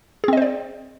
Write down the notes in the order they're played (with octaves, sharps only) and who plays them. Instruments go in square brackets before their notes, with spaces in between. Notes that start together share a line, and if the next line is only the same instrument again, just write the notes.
[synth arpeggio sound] G#4
C4
D#5
C5
D5